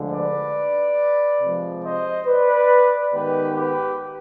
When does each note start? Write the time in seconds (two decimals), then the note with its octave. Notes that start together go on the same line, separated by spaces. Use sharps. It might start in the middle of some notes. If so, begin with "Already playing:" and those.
Already playing: D2 D3 F3 G#3
0.11 B4 D5
1.40 C3 F3 G#3
1.84 C5 D#5
2.27 B4 D5
3.13 G#2 D#3 G#3 B3 G4 B4
3.56 G4 B4